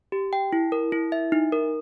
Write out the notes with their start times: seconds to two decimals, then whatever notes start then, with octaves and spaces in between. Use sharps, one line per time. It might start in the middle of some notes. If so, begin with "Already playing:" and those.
0.12 G4
0.33 G5
0.53 E4
0.72 A#4
0.92 E4
1.12 E5
1.32 D#4
1.52 A#4